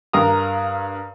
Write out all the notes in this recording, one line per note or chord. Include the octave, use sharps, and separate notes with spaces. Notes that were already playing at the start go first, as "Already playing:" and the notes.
G2 A#4 F5 A#5 D#6